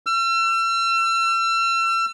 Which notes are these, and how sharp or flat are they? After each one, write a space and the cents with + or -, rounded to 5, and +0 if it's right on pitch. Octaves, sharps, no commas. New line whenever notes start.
E6 +40